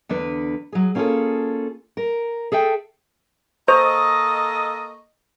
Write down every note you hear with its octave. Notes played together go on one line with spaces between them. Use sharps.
E2 D3 D4 B4
F#3 G#4
A#3 C#4 F4 F#4 G#4 A4
A#4
G#4 A4 E5 G5 A5
A#3 A4 C5 D#5 C#6